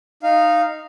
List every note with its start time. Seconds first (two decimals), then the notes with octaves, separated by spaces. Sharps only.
0.23 D#4 F5